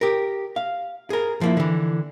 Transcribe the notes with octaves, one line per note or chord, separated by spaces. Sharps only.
G4 A#4
F5
G#4 A#4
F3 A#3 E4
D3 E3